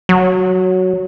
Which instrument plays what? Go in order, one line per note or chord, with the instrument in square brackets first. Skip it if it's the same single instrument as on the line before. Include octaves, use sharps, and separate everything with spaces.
[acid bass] F#3